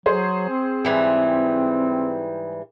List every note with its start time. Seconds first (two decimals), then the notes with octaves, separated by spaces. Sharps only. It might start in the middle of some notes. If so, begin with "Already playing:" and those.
0.06 F#3 G#4 C5
0.49 C4
0.85 G#2 E3 G3